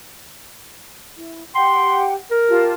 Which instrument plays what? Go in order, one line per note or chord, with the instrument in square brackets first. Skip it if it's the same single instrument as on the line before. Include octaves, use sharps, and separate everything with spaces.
[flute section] E4
[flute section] G4 F#5 G5 [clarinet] C6
[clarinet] A#4
[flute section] F4 G4 A5